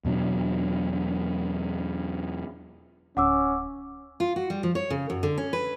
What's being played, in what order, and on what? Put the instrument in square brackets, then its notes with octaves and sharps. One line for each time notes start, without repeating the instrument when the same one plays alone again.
[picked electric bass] E2 B2 F#3 D4
[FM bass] D1 [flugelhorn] C#4 [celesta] F#5 D6 E6
[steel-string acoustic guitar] F4
F#4
G3
F3
C#5
C#3
F#2
D3
C#4
B4